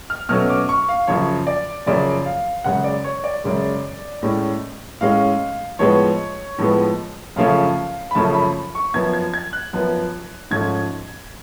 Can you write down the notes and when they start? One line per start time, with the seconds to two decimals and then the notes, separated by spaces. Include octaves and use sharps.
0.10 F6
0.29 B2 F#3 A3 C#4 F6
0.49 D6
0.69 C#6
0.89 F5
1.07 F#2 C#3 F3 C#5
1.47 D5
1.86 F#2 C#3 F3 D5
2.26 F5
2.64 F#2 C#3 G#3 F#5
2.84 D5
3.04 C#5
3.24 D5
3.44 F#2 C#3 G#3
4.23 A2 G#3 C#4
5.01 A2 G#3 C#4 F5
5.79 A2 F3 G#3 B3 C#5
6.58 A2 F3 G#3 B3
7.36 F#2 C#3 F3 A3 C#4 F5
8.11 B5
8.15 F#2 C#3 F3 A3 C#4 A5
8.34 B5
8.75 C#6
8.94 F#2 F3 B3 G#6
9.13 G#6
9.34 G#6
9.53 F#6
9.73 F#2 F3 B3
10.51 G#2 F3 A3 C#4 G#6